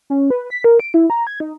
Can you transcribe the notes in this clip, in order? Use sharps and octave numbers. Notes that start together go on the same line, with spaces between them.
C#4
B4
B6
A#4
D7
E4
A#5
G#6
D#4